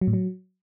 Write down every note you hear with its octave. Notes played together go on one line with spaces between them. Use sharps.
F#3
A2
F#3